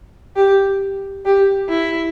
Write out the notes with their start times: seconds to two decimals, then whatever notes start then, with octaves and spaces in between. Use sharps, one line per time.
0.36 G4
1.25 G4
1.69 E4